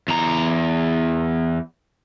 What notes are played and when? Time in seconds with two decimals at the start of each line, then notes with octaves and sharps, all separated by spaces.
0.08 E2 A#5